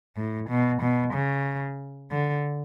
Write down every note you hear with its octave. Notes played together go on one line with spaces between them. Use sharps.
A2
B2
B2
C#3
D3